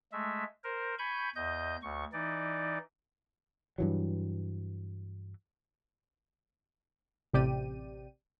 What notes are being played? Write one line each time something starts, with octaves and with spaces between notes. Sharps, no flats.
G#3 A3 E5
A#4 C5
G#5 B5 C#6 G6
E2 D#5 G6
D2 C#6
E3 D#4 D5
G2 E3 F#3
A1 C3 G4 D5 G5 D#7